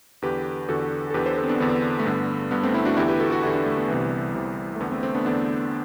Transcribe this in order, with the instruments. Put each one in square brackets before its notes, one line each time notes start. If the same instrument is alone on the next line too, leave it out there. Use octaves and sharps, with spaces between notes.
[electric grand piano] E2 D3 G4 B4
E2 D3 F#4 A4
A4
E2 D3 G4 B4
A4 C5
A4 C5
C4
B3 D4
E2 D3 B3
A3
G2 D3 B3
G2 D3 B3
A3 C4
C4 E4
D4 F#4
E2 D3 E4 G4
G4 B4
F#4 A4
F#4 A4
E2 D3 E4 G4
D4 F#4
A3
B3
C2 C3 E3
C2 C3 E3
A3
E2 D3 B3
A3 C4
A3 C4
B3 D4
E2 D3 B3 D4